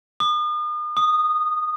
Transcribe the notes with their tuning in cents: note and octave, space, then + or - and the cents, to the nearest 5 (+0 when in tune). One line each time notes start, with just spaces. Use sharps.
D#6 -40
D#6 -15